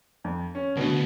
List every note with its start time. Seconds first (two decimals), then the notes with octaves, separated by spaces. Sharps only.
0.24 F2
0.55 C#4
0.77 D2 B2 D3
0.91 D2